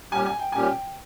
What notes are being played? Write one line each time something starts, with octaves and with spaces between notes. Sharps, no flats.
A#2 G3 C#4 G4 G#5
G#5
G5
A#2 G3 C#4 G4 G#5
G5